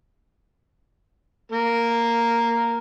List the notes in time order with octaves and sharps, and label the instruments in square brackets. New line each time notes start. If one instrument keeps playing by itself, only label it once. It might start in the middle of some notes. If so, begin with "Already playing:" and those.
[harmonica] A#3 A#4